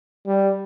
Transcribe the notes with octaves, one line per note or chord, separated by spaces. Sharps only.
G3